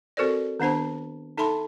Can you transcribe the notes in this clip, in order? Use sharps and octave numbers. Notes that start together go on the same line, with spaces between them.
C4 F#4 A4 A#4 C5 D5
D#3 B3 D4 C5 A5
D#4 A4 E5 A5 B5 C6